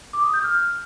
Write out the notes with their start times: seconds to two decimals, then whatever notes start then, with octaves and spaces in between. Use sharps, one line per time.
0.13 D6
0.23 D#6
0.34 G6
0.44 F6